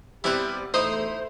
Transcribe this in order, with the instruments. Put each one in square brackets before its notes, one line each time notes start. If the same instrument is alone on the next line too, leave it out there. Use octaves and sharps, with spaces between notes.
[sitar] G3 B3 C4 [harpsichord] E4 B4 [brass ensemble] G4
[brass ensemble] E2 B2 A3 [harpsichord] D#4 D#5 [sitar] E4 [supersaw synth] C5